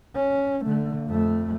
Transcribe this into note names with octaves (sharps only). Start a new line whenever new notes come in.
C#4
D3 A3
F2 A3